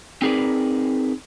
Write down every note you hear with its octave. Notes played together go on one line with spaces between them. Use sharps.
C4 D#4 G#4 A#4 B4 D5